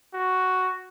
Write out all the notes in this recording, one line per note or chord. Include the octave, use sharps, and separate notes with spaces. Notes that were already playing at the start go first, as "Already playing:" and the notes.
F#4